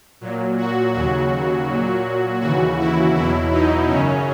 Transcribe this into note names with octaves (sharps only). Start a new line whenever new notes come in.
A#2 F#3
F#4
D#2 C#3 F#3 F#4
A#2 F#3
D#2 C#3 E3 F#4
E4
E2 B2 F#3 E4
D#4
F#2 C#3 F#3 C#4